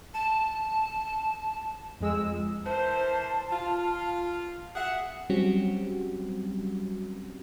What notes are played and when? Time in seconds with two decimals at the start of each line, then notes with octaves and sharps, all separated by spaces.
0.14 A5 E7
2.00 F2 G#3 E6
2.65 E3 A#4 C5 A5
3.51 F4
4.76 G#4 E5 F#5
5.30 F#3 G3 C4 C#4 F#4 G4